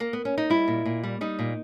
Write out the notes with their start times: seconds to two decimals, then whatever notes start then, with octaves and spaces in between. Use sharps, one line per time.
0.00 A#3
0.13 B3
0.25 C#4
0.38 D#4
0.50 G3 E4
0.68 A#2
0.85 A#2
1.04 G3
1.21 G3 D#4
1.39 A#2